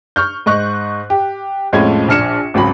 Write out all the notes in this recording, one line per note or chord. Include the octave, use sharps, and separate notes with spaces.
C#6 F6 G6
G#2 D#5 C#6 F#6
G4
F2 A2 G#3 C#4 F4 G#6
A#1 D4 F6 C#7 E7
G#1 C#2 F#3 B5